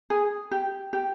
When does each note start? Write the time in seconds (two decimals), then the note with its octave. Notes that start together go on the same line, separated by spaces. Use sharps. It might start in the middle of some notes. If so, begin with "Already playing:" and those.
0.10 G#4
0.51 G4
0.93 G4